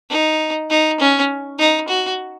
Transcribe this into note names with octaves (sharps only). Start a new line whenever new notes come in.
D#4
D#4
C#4
D#4
F#4